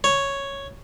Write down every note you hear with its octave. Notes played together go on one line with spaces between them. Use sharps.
C#5